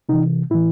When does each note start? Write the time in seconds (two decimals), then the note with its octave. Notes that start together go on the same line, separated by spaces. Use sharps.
0.09 C3 E3 D#4
0.50 A2 E3 E4